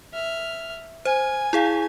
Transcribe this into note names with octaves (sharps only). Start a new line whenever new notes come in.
E5 F6
C5 G#5
E4 G#4 F5